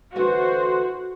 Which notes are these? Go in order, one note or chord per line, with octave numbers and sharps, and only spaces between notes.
D3 E3 A3 F#4 C5